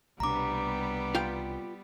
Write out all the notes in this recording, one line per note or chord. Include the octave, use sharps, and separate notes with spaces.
C2 B2 G3 B3 D4 G4 A#5 D6
F4 G5